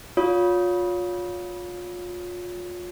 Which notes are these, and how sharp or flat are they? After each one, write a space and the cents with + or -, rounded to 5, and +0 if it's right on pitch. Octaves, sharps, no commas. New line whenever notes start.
F4 +30 C#5 +30 D#6 +20